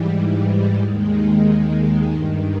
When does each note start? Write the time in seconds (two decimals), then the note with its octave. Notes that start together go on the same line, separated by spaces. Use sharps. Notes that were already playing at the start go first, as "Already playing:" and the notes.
Already playing: G#2 E3 G3
0.78 D#2 D#3 G#3
2.07 G2 D#3